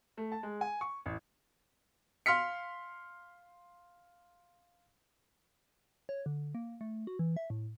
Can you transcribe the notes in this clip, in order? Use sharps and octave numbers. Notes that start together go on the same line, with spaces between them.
A3
A5
G#3
G#5
C#6
A1
F5 C6 F6 B6 C#7
C#5
D3
A#3
A3
F#4
E3
E5
A2